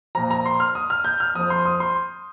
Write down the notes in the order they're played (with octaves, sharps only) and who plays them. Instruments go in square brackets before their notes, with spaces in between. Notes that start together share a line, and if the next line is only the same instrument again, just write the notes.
[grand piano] A#2 F3 A#5
A#5
C6
F6
D#6
F6
G6
F6
F2 F3 D#6
C6
D#6
C6